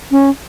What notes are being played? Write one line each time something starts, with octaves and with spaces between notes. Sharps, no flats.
C#4